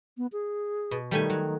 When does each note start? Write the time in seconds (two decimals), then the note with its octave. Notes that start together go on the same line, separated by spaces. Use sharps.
0.18 B3
0.33 G#4
0.91 B2
1.11 D#3 G3 A3 G#5
1.30 F#3